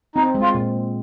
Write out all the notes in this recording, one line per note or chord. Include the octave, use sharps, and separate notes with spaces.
C4 D#4
G#3
F4
A#2